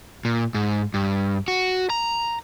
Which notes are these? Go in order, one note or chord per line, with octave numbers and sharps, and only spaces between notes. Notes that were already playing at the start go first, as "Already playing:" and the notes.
A#2
G#2
G2
F#4
A#5